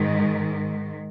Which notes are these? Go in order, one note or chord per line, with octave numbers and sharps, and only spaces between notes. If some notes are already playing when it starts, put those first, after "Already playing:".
Already playing: G#2 D#3